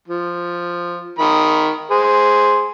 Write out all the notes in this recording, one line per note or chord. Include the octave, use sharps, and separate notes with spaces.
F3
D#3 B5
G#4 C5